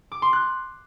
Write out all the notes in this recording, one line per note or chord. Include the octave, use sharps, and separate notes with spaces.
D6
C6
F#6